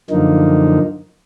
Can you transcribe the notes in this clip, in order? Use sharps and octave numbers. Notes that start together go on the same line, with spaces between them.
F#2 D3 F3 A#3 D#4